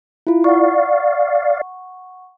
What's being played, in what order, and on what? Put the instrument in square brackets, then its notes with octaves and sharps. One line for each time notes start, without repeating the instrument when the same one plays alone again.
[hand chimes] E4 F4
[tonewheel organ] D5 F5 [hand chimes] F#5 C#6